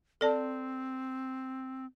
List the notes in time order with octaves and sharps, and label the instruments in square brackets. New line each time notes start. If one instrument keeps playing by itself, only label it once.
[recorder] C4 [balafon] A4 D5 A5